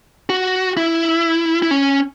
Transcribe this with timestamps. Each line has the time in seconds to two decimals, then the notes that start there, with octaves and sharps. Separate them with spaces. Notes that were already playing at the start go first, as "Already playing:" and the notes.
0.30 F#4
0.77 E4
1.62 E4
1.71 C#4